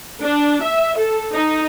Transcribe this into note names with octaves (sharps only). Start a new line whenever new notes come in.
D4
E5
A4
D#4